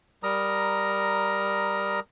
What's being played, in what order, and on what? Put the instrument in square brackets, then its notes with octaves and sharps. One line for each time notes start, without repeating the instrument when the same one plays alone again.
[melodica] G3 A#4 A#5 D#6